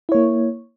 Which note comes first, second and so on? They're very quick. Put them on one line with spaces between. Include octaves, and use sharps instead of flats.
E4 C#5 A#3